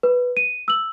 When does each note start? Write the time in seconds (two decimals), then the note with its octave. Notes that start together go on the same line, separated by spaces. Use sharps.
0.03 B4
0.37 D#7
0.68 E6 F#7